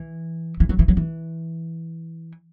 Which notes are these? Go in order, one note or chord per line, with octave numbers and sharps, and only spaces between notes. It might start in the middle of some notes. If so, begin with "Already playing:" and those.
Already playing: E3
E3
F#3
E3
F#3
E3